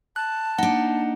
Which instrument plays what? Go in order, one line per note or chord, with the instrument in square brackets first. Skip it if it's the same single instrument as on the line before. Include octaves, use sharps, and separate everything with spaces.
[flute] A5 [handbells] F#6
[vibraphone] A#3 [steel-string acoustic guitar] D4 D#4 [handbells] F#5